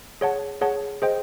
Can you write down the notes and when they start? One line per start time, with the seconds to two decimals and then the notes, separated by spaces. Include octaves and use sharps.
0.21 G#4 C#5 F#5 A5
0.61 G#4 C#5 F#5 A5
1.02 G#4 C5 D#5 G5